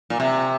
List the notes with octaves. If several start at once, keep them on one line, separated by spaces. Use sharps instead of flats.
A#2
C3